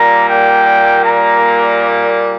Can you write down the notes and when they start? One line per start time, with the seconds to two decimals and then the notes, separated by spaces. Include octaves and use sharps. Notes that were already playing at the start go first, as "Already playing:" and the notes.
Already playing: A#2 G3 A#3 A#5
0.28 G5
1.05 A#5